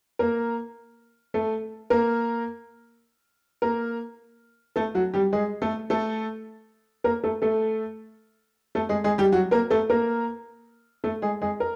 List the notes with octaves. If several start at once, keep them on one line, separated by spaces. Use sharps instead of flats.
A#3 A#4
A3 A4
A#3 A#4
A#3 A#4
A3 A4
F#3 F#4
G3 G4
G#3 G#4
A3 A4
A3 A4
A#3 A#4
A3 A4
A3 A4
A3 A4
G#3 G#4
G#3 G#4
G3 G4
F#3 F#4
A#3 A#4
A3 A4
A#3 A#4
A3 A4
G#3 G#4
G#3 G#4
A#4